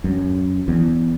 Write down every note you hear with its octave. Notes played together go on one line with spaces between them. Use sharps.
F#2
E2